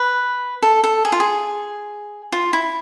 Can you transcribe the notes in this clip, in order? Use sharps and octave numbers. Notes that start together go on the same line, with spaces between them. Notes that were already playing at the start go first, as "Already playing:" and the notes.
Already playing: B4
A4
A4
G#4
F4
G#4
F4
E4